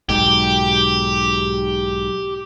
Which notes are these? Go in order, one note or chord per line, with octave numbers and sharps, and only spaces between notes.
B1 G#2 B2 G4